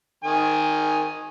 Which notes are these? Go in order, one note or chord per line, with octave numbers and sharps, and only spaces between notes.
D#3 G#5